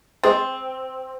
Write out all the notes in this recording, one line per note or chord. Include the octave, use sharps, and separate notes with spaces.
G#3 C4 G#4 A6